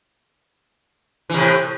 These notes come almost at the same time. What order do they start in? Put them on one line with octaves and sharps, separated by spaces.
E3 C3 A2